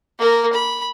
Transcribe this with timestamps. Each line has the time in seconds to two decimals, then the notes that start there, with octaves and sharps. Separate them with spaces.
0.19 A#3 A#4
0.53 B5